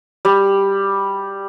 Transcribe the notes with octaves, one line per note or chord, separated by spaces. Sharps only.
G3